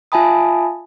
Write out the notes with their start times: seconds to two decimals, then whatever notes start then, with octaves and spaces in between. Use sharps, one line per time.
0.12 F4 E5 G#5 A5 B5 D#6